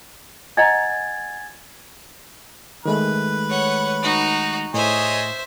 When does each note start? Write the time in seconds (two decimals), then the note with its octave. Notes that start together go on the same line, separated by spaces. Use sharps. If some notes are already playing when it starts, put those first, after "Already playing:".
0.57 D#5 F#5 G#5 A#5 G#6 A6
2.85 D#3 G#3 A3 B4
3.49 C#5 F#5
4.02 D#4 F#4
4.74 A2 G#4 C5 C#5 D#5 E5